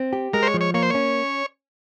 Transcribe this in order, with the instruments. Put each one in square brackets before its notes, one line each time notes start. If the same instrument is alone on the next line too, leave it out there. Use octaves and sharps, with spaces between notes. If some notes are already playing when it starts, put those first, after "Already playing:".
Already playing: [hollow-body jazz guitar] C4
G4
[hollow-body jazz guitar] G#3 [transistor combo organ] A#4
[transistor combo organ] C5
C#5
[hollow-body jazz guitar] F3
[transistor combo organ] C#5
[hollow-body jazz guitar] A#3 [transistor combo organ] C#5
[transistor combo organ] C5
[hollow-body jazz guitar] C#4 [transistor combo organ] C#5